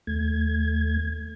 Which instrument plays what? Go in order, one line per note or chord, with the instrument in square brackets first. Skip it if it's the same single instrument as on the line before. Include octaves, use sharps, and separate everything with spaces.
[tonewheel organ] D#2 A3 G#6